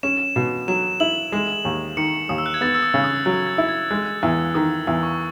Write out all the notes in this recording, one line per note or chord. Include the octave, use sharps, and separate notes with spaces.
C#4 E7
B2
F#3 E7
E4 F#7
G#3 E7
D#2
D#3 C#7
D#2 D#6
E6
F#6
G#6
B3 A6
E6
D#6
C#3
D#6
F#3 F#6
G#6
E4
G#6
G#3 F#6
E2 E6
D#3 D#6
E2 E6
C#6